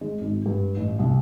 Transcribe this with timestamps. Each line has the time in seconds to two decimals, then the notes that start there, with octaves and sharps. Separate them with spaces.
0.01 G#3
0.21 G#1
0.46 G2
0.77 A1
0.99 C2